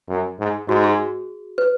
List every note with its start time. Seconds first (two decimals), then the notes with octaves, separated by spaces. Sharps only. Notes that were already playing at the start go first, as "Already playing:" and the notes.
0.09 F#2
0.39 G#2
0.68 G#2 F#4
0.84 G#4
1.58 B4